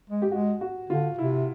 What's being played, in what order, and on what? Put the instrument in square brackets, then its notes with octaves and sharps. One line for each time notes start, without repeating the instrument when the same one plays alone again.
[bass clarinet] G#3
[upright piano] G4
[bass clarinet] G#3 [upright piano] F#4
[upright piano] F#4
[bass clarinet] D3 [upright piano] F4
[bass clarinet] C3 [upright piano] E4